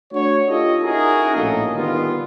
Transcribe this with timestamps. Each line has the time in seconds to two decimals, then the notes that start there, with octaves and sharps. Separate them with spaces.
0.13 A3 D4 F#4 C#5
0.47 D#4 F4 G4 A4 D#5
0.82 C#4 D#4 E4 F#4 G#4 A#4
1.35 A#1 A2 A#3 G#4 A4 D#5
1.74 D3 D#3 G3 B3 F4